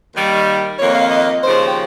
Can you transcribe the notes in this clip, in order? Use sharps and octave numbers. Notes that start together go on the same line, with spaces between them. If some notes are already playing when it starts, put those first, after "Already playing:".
D#2 D#3 G3
F2 D#3 A#3 C#5
F5
D#5
D#2 C#3 F3 C5
G5